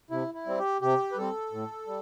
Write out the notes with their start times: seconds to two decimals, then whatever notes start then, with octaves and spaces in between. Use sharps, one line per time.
0.11 C3 E4
0.34 E4
0.46 G3 C4
0.58 G4
0.81 C3 G4
1.12 B4
1.17 G3 C4 A4
1.52 A2
1.87 G3